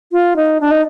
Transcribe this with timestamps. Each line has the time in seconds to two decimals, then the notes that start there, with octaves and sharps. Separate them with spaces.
0.12 F4
0.36 D#4
0.61 D4
0.71 D#4